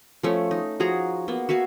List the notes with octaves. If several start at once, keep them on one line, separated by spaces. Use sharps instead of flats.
F3 A3 C#4 C#5
D#4
F3 F#4 G#4 A#5
A#3 B3
F#4 E5 F5 G#5